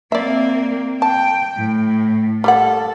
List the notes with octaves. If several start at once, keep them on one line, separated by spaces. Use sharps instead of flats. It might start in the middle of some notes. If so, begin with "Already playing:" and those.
A#3 C4 D5 E5
G5 A5
A2
G3 A#3 A4 F#5